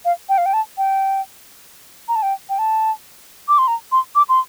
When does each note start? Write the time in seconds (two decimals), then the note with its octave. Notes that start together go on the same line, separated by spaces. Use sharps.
0.05 F5
0.29 G5
0.38 F5
0.46 G5
0.54 A5
0.78 G5
2.08 A#5
2.16 A5
2.23 G5
2.49 G5
2.59 A5
3.48 D6
3.58 C6
3.68 A#5
3.92 C6
4.15 D6
4.29 C6